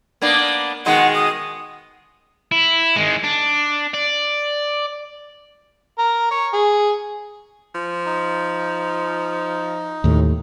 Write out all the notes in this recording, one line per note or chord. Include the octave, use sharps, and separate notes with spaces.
A#3 B3 D4
B2 D#3 G#3 F#5
D#6
E4
D#3 G#3
D4
D5
A#4
C#5
G#4
F3
D#4
D#2 A2